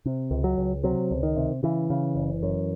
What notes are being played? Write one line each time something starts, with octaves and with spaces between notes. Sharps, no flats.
C3
C#2
F#3
C#2
C3 F#3
C#2
D#3
C3
C#3 E3
C#3
F#1
F#2